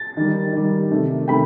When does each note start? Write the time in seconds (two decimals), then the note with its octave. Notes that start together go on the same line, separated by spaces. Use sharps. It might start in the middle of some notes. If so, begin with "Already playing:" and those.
Already playing: A6
0.17 D#3 G3
0.53 D#3 G3
0.90 C3 D#3 A3
1.28 C3 D#3 A3 G5 B5